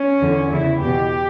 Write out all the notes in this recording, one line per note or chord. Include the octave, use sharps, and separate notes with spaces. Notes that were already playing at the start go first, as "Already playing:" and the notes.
Already playing: C#4
E2 D3
E2 C#3 E3 E4
E2 B2 G4